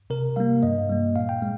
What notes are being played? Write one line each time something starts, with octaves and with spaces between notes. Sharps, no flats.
C3 A#4
G3 A#3 F5
G2 D#5
G3 A#3
A#2 F5
G5
G#3